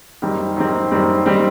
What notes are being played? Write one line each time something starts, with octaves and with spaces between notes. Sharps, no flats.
F#2 D#3 G3 C4
F#2 D#3 G3 C4
F#2 D#3 G3 C4
D#3 G3 C4